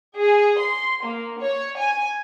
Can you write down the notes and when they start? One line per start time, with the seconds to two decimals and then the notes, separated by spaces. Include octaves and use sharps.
0.16 G#4
0.58 C6
1.03 A#3
1.40 C#5
1.78 G#5